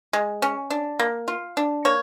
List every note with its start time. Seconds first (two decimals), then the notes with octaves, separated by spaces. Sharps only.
0.13 G#3
0.42 C#4
0.70 D4
0.99 A#3
1.28 F4
1.57 D4
1.85 A#3 C#5